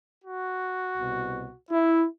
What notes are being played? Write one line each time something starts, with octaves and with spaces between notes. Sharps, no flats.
F#4
C2 B2
E4